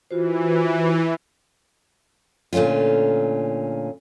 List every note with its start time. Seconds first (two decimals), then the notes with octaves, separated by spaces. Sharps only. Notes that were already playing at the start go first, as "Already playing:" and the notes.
0.11 E3 F4 F#4 C5
2.53 A#2 D3 A3 C#4 F4